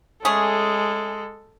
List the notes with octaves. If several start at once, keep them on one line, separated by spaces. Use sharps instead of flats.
G#3 A3 C#4 G#4 A4